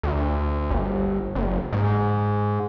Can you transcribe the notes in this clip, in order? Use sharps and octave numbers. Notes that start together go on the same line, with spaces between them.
D2
G1
F#1
G#2